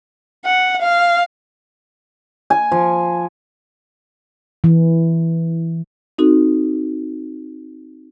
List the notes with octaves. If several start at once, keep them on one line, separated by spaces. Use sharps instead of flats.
F#5
F5
G#5
F3
E3
C4 D#4 F#4 A4